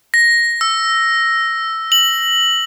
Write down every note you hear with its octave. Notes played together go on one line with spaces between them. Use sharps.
A#6
E6
F#7